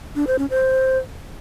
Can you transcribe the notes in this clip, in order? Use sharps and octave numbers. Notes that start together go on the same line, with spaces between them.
D4
C5
C#4
C5